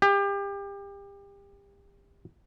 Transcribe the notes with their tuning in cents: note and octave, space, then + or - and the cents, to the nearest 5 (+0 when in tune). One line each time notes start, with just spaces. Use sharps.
G4 +30